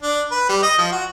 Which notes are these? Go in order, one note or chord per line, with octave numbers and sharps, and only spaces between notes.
D4
B4
G3
D#5
F3
F#4